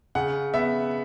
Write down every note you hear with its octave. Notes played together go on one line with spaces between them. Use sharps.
C#3 F#5
B3 E5